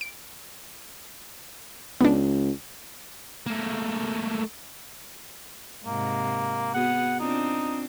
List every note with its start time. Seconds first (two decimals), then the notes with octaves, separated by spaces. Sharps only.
0.01 D7
2.01 C#2 B3 D4
3.46 A3 A#3
5.86 G#2 C3 A#3
6.74 B3 F#4 G#4 F#5
7.20 C4 D4 D#4 F4